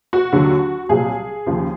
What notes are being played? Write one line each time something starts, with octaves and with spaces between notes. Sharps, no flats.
F#4
D#2 D3 F#3
C2 A#2 F#3 G#4
D#2 C#3 F3